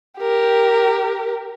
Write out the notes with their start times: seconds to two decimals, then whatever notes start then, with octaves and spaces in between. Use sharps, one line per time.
0.19 G4 A#4